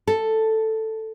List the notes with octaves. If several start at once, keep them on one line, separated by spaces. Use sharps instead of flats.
A4